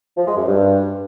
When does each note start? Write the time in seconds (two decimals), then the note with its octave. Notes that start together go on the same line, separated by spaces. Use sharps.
0.17 F3
0.27 G#3
0.37 F#2
0.47 G2